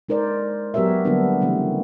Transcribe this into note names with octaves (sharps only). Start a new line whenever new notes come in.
G#3 D#4 A#4 C5 D5
F#3 B3 G4 A#4 C#5 E5
D3 F#3 G3 A#3 B3 D4
C#3 E3 A3 C4